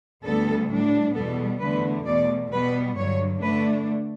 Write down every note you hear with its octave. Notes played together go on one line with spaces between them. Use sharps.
D2 D3 G3 B3 A4
A2 G3 D4
E2 B2 G3 B3 A4
E2 D3 A3 B4
E2 B2 A3 D5
B2 G3 B3 B4
G2 D3 F#3 C#5
D3 A3 D4 B4